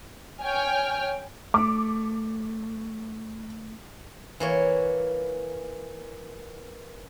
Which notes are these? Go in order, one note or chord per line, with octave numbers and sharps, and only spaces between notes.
C#5 G5 G#5 F6
A3 D6
E3 A#3 C#5